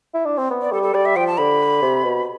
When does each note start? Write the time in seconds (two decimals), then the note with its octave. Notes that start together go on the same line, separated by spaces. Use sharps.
0.14 E4
0.26 D4
0.38 C4
0.50 B3
0.62 D5
0.72 G3 A4
0.83 A4
0.94 G3 D5
1.05 E5
1.16 F3 G5
1.27 A5
1.38 D3 B5
1.82 C3
2.04 B2